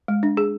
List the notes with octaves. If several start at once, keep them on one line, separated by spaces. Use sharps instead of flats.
G#3
D4
G#4